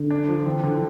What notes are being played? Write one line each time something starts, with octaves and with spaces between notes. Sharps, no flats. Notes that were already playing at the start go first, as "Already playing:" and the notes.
Already playing: D3
D4
F3
E3 C4
D3